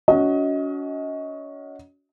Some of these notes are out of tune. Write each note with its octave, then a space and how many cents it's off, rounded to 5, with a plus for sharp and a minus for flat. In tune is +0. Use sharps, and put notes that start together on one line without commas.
C#4 +40 F#4 +0 D#5 +30